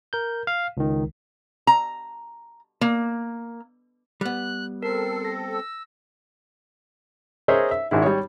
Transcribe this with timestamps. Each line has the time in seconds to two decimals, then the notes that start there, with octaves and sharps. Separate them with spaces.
0.13 A#4 G6
0.47 F5
0.77 C#2 D#3
1.67 A#5
2.81 A#3
4.21 G3 B3 F#6
4.83 C4 A4 A#4 C7
5.25 A#6
5.51 E6
7.48 G#4 A#4 C5 C#5 D#5 E5
7.71 E5
7.91 G#1 G#2 D#3 E4
8.02 G3 C#5